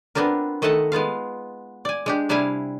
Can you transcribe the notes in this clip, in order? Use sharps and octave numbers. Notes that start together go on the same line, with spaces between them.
B3 C4 D4 F4 A#4
D#3 A3 D#5 E5 F#5 A5
G#3 B3 F4 F5
D5 G#5
G#3 D4 G4
C3 G3 D4 E4 F5 G#5